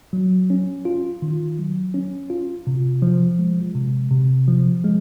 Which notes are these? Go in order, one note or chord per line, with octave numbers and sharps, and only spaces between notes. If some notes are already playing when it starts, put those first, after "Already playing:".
F#3
C#4
F4
D#3
F#3
C#4
F4
C3
F3
G#3
C3
C3
F3
G#3